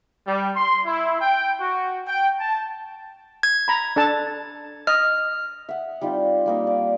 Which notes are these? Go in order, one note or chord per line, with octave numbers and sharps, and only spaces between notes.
G3
C6
E4
G5
F#4
G5
A5
G#6
A#5 B5
D4 A4 A5
D#5 F6
E5 F#5
G3 C4 D#4 F4
G3 A#3 D#4
D5